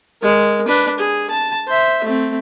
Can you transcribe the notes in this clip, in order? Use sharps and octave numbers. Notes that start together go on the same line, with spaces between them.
G#3 A#4
D4 B4
G#4
A5
C5 E5
A3 C4